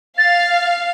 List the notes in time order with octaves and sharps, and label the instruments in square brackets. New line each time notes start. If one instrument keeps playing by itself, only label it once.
[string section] F5 [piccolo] A6